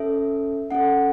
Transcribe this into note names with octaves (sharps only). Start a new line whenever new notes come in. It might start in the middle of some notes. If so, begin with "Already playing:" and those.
Already playing: C#4 A4 E5
C#4 A4 F#5